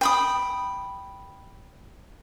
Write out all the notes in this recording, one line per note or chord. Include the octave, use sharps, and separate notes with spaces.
G5 B5 D#6